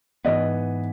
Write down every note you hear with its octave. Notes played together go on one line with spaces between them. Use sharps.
G#2 E3 B3 D#5